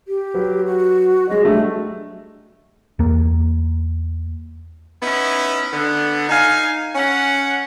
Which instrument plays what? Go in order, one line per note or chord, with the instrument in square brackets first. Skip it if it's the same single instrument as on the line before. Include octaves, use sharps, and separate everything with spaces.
[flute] G4
[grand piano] F#3 B4
[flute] F#4
[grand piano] F#3 G#3 [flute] D#5
[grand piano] F#3 G3 A3 [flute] D4
[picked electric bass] E2 A#3
[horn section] B3 C#4 D#4 E4
D3 B3
D#4 F5 G#5
C#4 F#5